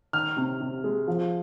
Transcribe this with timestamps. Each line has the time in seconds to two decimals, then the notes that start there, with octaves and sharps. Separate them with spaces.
0.13 D#3 F6
0.37 C3
0.61 C3
0.84 G#3
1.08 F3